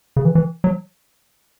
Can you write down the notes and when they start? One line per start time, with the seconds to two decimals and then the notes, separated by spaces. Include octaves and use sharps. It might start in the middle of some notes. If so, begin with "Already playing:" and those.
0.17 C#3
0.25 E3
0.35 E3
0.64 F#3